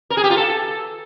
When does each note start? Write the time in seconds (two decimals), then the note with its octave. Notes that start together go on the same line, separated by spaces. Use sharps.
0.10 A#4
0.17 G#4
0.23 G4
0.30 F4
0.37 A4